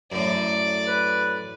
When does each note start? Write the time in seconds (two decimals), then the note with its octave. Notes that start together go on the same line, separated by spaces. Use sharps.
0.12 F#2 A2 D5
0.88 B4